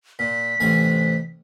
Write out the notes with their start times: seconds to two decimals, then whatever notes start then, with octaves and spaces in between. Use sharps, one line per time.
0.19 A#2 B6
0.60 A1 C3 G#5